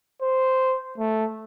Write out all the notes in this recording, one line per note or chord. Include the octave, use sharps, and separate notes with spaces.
C5
A3